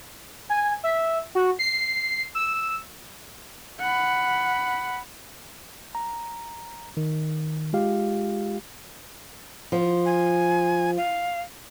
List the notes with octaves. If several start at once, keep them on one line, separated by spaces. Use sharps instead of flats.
G#5
E5
F#4
C7
E6
F#5 B5
A#5
D#3
G#3 F4 G4 F5
F3
G#5
F5